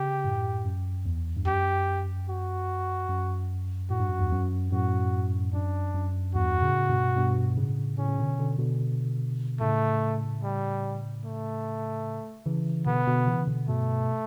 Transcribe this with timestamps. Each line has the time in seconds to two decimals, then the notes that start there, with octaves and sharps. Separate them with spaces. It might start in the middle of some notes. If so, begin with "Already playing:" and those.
Already playing: C#3 G4
0.24 F#2 A2
0.65 F#2
1.06 E2
1.36 G2
1.46 F#2 G4
2.29 F#4
3.09 F#2
3.90 A2 F#4
4.00 G2
4.09 F#2
4.19 E2 G2
4.32 F#2
4.72 F#2 A2 F#4
5.53 F#2 D4
5.94 F#2
6.35 E2 G2 F#4
6.62 A2 C#3
6.89 G2 B2
7.17 G2 B2
7.57 A2 C#3
7.97 A2 C#3 C#4
8.09 C#3
8.18 B2 D3
8.38 B2 D3
8.59 B2 D3
9.61 A2 C#3 A3
10.43 G3
11.24 A3
12.46 C#3 E3
12.86 B2 D3 B3
13.06 B2 D3
13.27 C#3 E3
13.47 B2 D3
13.68 G2 B2 A3